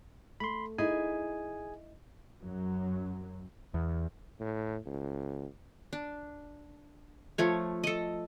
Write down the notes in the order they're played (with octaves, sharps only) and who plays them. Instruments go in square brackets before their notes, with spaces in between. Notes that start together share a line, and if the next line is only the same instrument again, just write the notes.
[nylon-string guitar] A3 [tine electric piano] B5 C6
[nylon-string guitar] D#4 E4 [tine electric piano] G#4 G#5
[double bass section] F#2 F#3
[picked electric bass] E2
[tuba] A2
C#2
[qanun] D4
F3 A3 C#5
A4 D#5